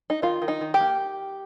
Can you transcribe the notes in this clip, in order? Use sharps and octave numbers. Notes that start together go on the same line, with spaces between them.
D#4
D#3 F4
D#3
D#4
D#3
G4
A#3